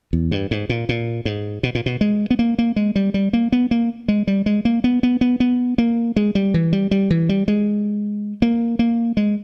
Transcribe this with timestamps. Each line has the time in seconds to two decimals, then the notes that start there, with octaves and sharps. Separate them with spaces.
0.13 E2
0.31 G2
0.51 G#2
0.69 A#2
0.89 A#2
1.25 G#2
1.63 B2
1.75 A#2
1.86 B2
2.01 G#3
2.30 B3
2.39 A#3
2.58 A#3
2.76 G#3
2.96 G3
3.14 G3
3.33 A#3
3.52 B3
3.71 A#3
4.08 G#3
4.27 G3
4.46 G#3
4.65 A#3
4.84 B3
5.03 B3
5.21 B3
5.40 B3
5.78 A#3
6.16 G#3
6.35 G3
6.54 E3
6.73 G3
6.91 G3
7.11 E3
7.29 G3
7.48 G#3
8.42 A#3
8.79 A#3
9.17 G#3